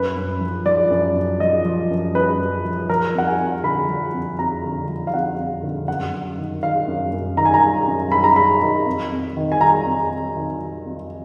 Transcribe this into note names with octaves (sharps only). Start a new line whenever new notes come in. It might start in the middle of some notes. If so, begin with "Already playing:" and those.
Already playing: F#2 B4
F#2
F3
F3 D5
F#2
F#2
F3 D#5
F3
F#2
F#2 B4
F3
F3
F3 A#4
F2 F#5
G#5
F2
D3 B5
F3
F2
F2 A#5
D3
F3
F5
F2 F#5
F2
D3
F#2 F#5
F#2
D#3
D#3 F5
F#2
F#2
D#3 A#5
G#5
A#5
D#3
F#2
F#2 B5
A#5
D#3 B5
D#3
F2
F2
D#3
G#5
D#3 A#5
F2
F2
D#3
D#3
F2